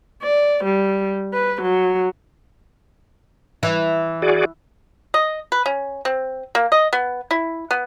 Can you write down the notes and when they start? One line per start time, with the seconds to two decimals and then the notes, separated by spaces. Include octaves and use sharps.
0.22 D5
0.64 G3
1.33 B4
1.62 F#3
3.63 E3
4.22 F#4 G#4 D5
5.14 D#5
5.52 B4
5.66 C#4
6.05 C4
6.55 A#3
6.72 D#5
6.93 B3
7.31 E4
7.71 B3